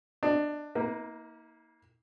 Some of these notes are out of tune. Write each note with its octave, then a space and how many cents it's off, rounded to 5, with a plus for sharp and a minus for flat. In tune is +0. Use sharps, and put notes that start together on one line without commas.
D4 +15 D#5 +0
A#3 +0 D#4 +45 B4 -40